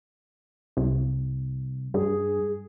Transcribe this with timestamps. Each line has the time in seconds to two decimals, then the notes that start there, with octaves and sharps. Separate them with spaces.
0.77 C2
1.94 G2 G#4